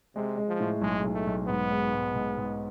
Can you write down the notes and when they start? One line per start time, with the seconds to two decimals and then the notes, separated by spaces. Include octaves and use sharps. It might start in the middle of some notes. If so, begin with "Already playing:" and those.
0.16 C3 G#3
0.37 G#3
0.48 F3
0.60 A2
0.81 B1 G#3
1.04 B1
1.15 A3
1.27 B1
1.48 G#2 B3
1.71 G#3
1.93 G#2
2.15 G#2
2.37 G#2